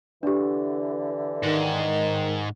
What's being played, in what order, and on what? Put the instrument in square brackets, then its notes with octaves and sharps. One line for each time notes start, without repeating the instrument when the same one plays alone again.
[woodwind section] D3 E3 [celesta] D4 G4
[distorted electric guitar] G#2 [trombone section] D#3